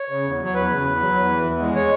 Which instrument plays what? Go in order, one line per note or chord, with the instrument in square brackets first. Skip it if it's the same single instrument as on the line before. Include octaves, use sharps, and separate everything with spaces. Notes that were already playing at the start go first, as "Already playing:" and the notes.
Already playing: [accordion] C#5
C#3
E2
F#3
C#5
E2 B4
C#3
E2
F#3
E2
E3
E2
G#3
C#5